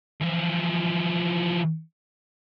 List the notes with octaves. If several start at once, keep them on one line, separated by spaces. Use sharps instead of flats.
E3 F3